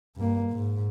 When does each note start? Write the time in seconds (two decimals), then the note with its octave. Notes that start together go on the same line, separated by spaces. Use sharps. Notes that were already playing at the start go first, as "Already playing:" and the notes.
0.17 G2 A#3
0.52 G#2